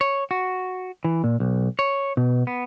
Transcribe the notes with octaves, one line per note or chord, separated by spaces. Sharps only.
C#5
F#4
E3
A#2
B1
C#5
B2
B3